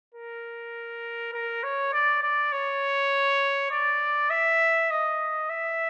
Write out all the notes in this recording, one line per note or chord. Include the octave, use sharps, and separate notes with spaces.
A#4
A#4
C#5
D5
D5
C#5
D5
E5
D#5
E5